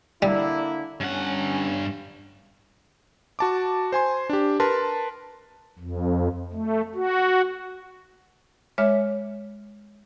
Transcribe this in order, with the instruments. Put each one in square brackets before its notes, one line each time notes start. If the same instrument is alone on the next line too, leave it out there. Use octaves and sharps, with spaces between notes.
[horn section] D3 A#3 E4 [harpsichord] G3
[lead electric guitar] G2 F#5 [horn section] C#4
[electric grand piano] F#4 A5 D6
C5 G#5 C6
D4 G4
A#4 B4 A5 C6
[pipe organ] F2
A3
F#4
[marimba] G#3 C#5 E5 D6 F6